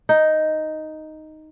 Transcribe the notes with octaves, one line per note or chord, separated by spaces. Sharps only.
D#4